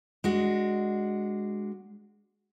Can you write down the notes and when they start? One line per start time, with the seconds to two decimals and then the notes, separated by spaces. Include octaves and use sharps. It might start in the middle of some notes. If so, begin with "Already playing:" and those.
0.24 G#3 D4 F#4